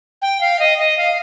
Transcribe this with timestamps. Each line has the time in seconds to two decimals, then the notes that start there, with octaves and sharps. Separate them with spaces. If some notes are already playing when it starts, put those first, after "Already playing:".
0.22 G5
0.41 F5
0.59 D#5
0.78 D#5
0.98 F5